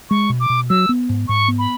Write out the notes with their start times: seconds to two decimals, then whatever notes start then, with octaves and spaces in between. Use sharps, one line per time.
0.10 G#3 C#6
0.30 B2
0.40 D6
0.50 B2
0.70 F#3 E6
0.89 B3
1.09 G#2
1.28 G#2 C#6
1.48 B3
1.59 B5